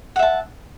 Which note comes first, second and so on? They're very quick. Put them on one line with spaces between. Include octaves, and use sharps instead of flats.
F#5 E5 A5